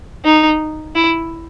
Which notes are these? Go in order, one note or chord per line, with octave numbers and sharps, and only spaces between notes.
D#4
E4